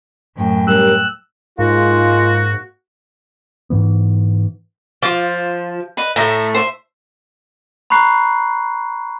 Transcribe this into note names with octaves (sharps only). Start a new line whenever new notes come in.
F#2 A2 G5
G3 C#4 G4 A#4 E6 F#6
G#2 G#3 A#3 F4 F#4
G#2 E3 B3
F3 F4 D6
B4 D#5
A2 A3 E5 A#5
C5 E5
A#5 B5 C#6 F#6 C7